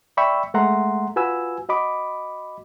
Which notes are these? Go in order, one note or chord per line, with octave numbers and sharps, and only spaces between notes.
D5 E5 G5 B5 C#6 E6
G#3 A3 E5 F#5 A#5 C6
F4 F#4 B4 G#5 E6
F#4 D#5 B5 D6